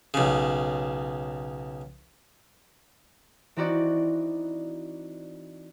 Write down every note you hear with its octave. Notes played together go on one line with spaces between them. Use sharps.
B1 C#3
E3 C4 D#4 E4 F#4 D5